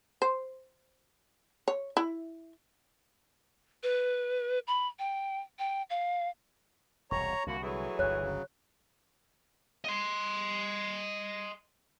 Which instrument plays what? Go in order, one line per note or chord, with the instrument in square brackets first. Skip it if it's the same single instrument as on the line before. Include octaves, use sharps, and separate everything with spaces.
[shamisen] C5
C#5
E4
[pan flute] B4
B5
G5
G5
F5
[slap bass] E1 C2 [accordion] C#5 A#5 [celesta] C#6
[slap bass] C2 D3 [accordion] A#3 [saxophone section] F#4
[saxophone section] E3 A3 G#4 [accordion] F#3
[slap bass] G1 D2 [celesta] C#5 F#6
[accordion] C#3 F#3
[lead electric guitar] D#5 C6